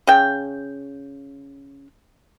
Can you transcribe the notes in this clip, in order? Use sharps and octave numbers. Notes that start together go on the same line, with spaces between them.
C#3 G5